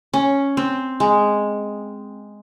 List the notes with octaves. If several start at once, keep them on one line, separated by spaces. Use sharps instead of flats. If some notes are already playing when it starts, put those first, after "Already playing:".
C#4
C4
G#3